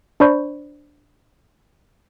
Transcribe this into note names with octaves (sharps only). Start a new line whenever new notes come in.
D4 C5 D5 B5 C#6 G6